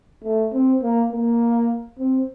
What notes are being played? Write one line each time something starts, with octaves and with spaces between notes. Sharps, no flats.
A3
C4
A#3
A#3
C4